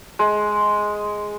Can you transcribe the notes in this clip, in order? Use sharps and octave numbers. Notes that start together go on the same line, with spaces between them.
G#3